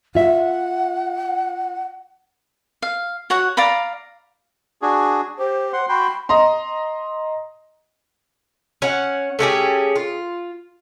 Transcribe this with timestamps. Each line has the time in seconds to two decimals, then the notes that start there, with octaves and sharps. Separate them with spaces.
0.15 F4 E5 F#5
2.82 F5
3.30 F#4 C#5 F#5
3.57 D5 F5 A#5 B5
4.82 D4 F#4 G#4
5.39 G4 C5
5.73 F#5 C6
5.89 F#4 G5 B5 C6
6.29 D#5 A#5 C6
8.82 C#4 F#5
9.39 A3 C#4 G4 G#4
9.96 F4